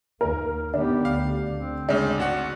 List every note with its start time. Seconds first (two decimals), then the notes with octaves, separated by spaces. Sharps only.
0.21 D#2 A#3 A#4
0.74 D#3 B3 D4 G4
1.05 D2 F5
1.54 D2 C4
1.89 C#3 G#3 D4
2.18 G#1 F#4 F#5